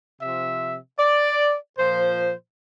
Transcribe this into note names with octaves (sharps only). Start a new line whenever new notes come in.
C3 F3 E5
D5
A#2 F3 C5